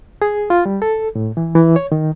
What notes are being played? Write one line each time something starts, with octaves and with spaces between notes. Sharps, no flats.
G#4
F4
G3
A4
A2
E3
E3
C#5
D#3